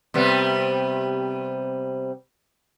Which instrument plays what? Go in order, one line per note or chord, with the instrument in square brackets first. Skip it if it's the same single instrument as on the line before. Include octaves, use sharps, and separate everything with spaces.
[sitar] C3 G3 B3